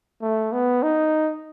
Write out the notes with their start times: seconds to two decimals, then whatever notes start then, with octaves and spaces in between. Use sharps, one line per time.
0.22 A3
0.53 B3
0.83 D#4